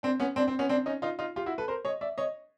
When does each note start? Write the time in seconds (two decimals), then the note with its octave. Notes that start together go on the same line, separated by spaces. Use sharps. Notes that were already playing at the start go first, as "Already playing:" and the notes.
0.03 C4 D4
0.20 B3 C#4
0.36 C4 D4
0.48 C4
0.59 B3 C#4
0.69 C4 D4
0.86 C#4 D#4
1.02 D#4 F4
1.19 D#4 F4
1.36 F4 G4
1.46 E4 F#4
1.58 A4 B4
1.68 A#4 C5
1.85 C#5 D#5
2.01 D5 E5
2.18 C#5 D#5